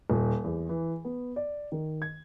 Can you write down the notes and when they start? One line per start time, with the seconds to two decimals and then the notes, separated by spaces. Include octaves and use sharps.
0.10 D#1
0.44 E2
0.69 E3
1.05 B3
1.36 D5
1.72 D#3
2.02 G#6